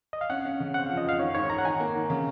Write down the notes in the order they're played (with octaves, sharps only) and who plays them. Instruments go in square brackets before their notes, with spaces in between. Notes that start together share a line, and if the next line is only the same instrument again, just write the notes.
[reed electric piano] D#5
F5
[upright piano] C#4 [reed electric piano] F#5
[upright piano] C#4
C#3
[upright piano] C4 [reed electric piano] F#5
[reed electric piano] F5
[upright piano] F3
[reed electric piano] D#5
[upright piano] F2 [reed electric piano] F5
[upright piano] D#3 [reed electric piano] C#5
[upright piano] G#2 [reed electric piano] C#5
[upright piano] D#3 [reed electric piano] A#5
[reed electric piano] F#5
[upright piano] D#3 [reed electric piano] G#5
[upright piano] A#3
D#3
C#3